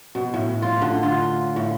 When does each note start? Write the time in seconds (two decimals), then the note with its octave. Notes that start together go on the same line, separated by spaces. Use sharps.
0.15 B2
0.34 A2
0.62 F4
0.82 D3
1.03 F4
1.56 A2